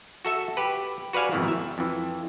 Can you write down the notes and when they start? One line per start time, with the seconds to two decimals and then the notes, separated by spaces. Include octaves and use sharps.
0.25 F#4 A4 E5
0.57 G4 B4
1.13 F#4 B4 D5 F5 G#5
1.32 F2 G#2 B2 D#3 E3
1.48 E5
1.78 F2 E3